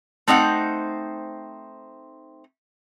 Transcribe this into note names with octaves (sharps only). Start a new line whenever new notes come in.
A3 C4 D#4 C5 F#5